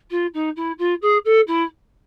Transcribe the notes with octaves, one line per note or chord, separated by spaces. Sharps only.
F4
D#4
E4
F4
G#4
A4
E4